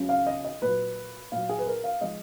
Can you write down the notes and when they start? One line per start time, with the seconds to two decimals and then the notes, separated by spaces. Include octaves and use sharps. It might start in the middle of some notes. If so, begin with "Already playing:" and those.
Already playing: C#2 C#3 F#3
0.09 F5
0.27 D#5
0.45 D#5
0.62 A#2 F#3 B4
1.32 A#2 F#3 F5
1.49 G#4
1.59 B4
1.67 A#4
1.84 F5
2.01 F3 G#3 D#5